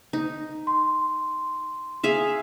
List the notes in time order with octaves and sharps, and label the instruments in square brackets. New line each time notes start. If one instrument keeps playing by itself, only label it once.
[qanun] D#4
[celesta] C6
[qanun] G#4 E5 F5